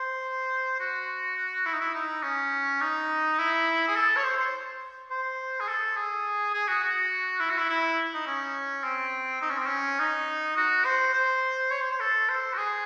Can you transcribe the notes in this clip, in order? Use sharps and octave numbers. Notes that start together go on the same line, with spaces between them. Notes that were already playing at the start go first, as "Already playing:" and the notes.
Already playing: C5
F#4
E4
D#4
E4
D#4
C#4
D#4
E4
G#4
A4
C#5
C5
C5
C5
G#4
A4
G#4
G#4
F#4
F#4
E4
F#4
E4
E4
D#4
C#4
C4
D#4
C#4
C4
C#4
D#4
F#4
C5
C5
C#5
C5
C5
A4
C5
F#4
G#4